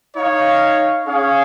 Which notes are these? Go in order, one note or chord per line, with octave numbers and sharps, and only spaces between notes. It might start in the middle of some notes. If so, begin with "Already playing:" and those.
D#4 C#5 F5
C#4 G#4 C#5 F5